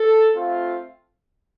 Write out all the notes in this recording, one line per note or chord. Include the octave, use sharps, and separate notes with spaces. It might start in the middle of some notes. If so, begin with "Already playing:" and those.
Already playing: A4
A3 C4 F4